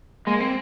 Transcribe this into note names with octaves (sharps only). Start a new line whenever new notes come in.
G#3 A#3
C4